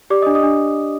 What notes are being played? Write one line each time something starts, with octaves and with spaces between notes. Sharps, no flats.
G4 D5 D6
D#5 D#6
D4
D#5 D#6
D4